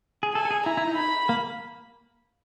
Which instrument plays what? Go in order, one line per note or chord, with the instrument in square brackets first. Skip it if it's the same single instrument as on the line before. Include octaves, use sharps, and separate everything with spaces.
[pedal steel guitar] G#4
[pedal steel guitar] A4 [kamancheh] G#5
[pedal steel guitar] A4
G#4
[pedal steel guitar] E4 [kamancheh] A#5
[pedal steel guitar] E4
D#4
[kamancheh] B5
[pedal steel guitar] A#3